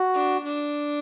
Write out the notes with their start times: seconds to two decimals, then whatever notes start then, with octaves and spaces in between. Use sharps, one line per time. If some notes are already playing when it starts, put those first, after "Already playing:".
Already playing: F#4
0.14 D4
0.44 D4